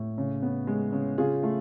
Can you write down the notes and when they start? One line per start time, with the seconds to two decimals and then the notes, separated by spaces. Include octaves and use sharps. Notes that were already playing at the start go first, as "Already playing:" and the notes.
Already playing: A2
0.18 C#3
0.42 B3
0.67 G#3
0.93 C#3
1.18 C#3 F4 G#4
1.43 A3 F4